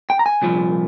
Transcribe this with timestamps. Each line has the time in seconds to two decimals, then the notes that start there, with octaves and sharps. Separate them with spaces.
0.10 G5
0.19 A#5
0.26 G#5
0.42 C2 A#2 F3